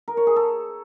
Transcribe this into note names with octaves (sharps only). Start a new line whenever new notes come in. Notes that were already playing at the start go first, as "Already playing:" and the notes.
A#4
C#5
G#4
A4